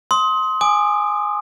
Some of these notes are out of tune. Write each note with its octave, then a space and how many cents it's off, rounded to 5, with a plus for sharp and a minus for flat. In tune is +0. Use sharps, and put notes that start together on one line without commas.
C6 +5 D#6 +30
G#5 +0 D#6 -40